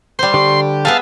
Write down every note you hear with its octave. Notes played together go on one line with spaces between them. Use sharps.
G3 C5 C6
D3 G4 D5 C#6
B3 G#4 E5 F5 A5